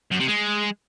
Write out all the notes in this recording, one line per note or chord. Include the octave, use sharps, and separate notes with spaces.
F#2
C3
G#3